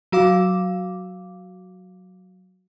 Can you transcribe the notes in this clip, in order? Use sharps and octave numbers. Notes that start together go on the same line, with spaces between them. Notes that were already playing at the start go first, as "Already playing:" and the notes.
F#3 F#4 F5 D6